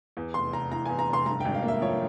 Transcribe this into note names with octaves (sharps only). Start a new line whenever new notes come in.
E2
F1 C6
F1 A#5
E3 A#5
E2 G#5
A#5
F1 C6
G2 A#5
G#1 G5
F5
A#3
E5
F3 C#5